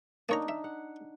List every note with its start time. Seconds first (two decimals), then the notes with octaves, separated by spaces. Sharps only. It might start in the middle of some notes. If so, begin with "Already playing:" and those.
0.29 A#3 D4 D#4 C#5 A#5
0.48 E5
0.64 F#5